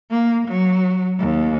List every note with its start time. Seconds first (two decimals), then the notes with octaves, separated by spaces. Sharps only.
0.10 A#3
0.48 F#3
1.19 D#2